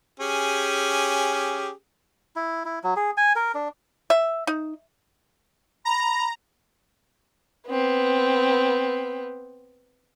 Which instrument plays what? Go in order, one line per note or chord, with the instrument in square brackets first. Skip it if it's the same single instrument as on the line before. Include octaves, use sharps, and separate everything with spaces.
[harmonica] C#4 G4 G#4
[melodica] E4
E4
F#3
G#4
G#5
A#4
D4
[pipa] E5
D#4
[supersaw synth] A#5 [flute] B5
[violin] B3 C4